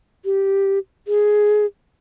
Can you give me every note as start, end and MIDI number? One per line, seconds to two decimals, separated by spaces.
0.25 0.79 67
1.08 1.66 68